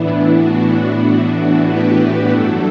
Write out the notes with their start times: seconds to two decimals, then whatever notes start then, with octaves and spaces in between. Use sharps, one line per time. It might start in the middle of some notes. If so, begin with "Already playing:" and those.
Already playing: A2 E3 B3 D4 E4
0.39 D4 F#4
1.03 D4 F#4
1.67 G4 B4
2.31 G2 F#3 A3 D4 F#4 A4